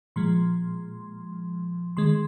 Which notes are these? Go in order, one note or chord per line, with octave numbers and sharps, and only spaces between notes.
A#2 F3 G#3 C6
D#3 G#3 C6